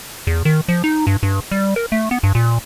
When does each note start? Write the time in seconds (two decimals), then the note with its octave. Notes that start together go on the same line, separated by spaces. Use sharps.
0.27 E2
0.45 D#3
0.68 F3
0.84 D#4
1.07 G2
1.23 G2
1.52 G3
1.76 A#4
1.92 A3
2.11 B3
2.23 G2
2.35 A#2